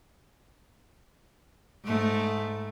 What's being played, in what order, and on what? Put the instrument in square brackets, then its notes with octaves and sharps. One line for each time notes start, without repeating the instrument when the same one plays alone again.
[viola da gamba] G#2 A3